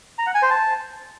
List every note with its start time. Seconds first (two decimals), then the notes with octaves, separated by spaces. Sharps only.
0.18 A#5
0.26 F#5
0.34 G#5
0.42 C5
0.50 A5